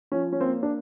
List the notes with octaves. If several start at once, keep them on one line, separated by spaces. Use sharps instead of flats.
F3 C#4
C#4
A#3 C4
D4